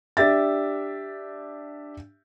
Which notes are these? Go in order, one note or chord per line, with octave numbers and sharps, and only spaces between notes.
D4 G4 E5 A6